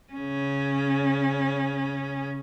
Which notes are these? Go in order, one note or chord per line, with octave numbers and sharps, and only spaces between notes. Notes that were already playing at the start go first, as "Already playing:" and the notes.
C#3 C#4